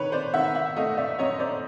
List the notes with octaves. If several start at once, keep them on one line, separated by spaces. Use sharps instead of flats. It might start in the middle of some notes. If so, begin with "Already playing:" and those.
Already playing: D#3 A3 B4 C#5
C5 D5
D#3 E5 F#5
E5 F#5
A3 D#5 F5
D5 E5
F#2 C#5 D#5
C5 D5